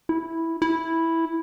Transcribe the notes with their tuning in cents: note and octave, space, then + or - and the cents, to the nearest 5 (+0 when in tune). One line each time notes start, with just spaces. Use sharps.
E4 -5
E4 -5